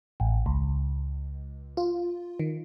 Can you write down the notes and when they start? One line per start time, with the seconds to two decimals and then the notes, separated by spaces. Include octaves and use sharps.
0.20 A1
0.46 C#2
1.77 F4
2.40 D#3